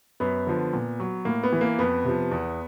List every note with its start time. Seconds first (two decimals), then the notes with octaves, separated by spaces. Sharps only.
0.20 F#2 B3
0.47 D3 F3
0.73 A#2
1.00 F#3
1.25 A2 A#3
1.43 B3
1.52 E3
1.61 A#3
1.79 F2 B3
2.05 C3 F3
2.31 E2